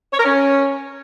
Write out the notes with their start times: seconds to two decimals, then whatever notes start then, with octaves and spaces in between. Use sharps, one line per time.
0.12 C#5
0.18 A#4
0.24 C#4